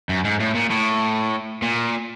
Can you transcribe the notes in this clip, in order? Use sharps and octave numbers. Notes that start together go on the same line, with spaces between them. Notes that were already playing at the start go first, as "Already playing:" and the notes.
F#2
G#2
A2
A#2
A2
A#2